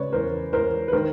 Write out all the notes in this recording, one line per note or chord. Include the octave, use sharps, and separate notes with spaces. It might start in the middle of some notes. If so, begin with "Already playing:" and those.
Already playing: C#3 B4 C#5 D5
E2 A#4 C5
E2 A#4 C5
B4
D#3 A#4 C5